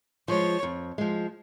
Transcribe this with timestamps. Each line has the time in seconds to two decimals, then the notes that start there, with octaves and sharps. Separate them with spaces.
0.28 F3 G#3 C#5
0.63 F2
0.98 F3 G#3